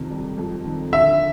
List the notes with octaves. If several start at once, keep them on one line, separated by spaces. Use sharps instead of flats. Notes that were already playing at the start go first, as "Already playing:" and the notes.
Already playing: F2 C3 D#3
G3
F2
D#3
D3 E5